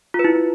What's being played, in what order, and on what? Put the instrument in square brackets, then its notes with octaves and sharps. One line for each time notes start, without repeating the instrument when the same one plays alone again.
[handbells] F4
B4
E4